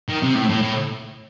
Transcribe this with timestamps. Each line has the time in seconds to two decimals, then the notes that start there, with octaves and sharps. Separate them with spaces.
0.08 D#3
0.22 C3
0.35 A2
0.49 A2
0.62 A2